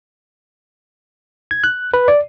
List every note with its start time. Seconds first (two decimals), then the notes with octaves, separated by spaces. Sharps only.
1.51 G#6
1.64 F#6
1.94 B4
2.08 D5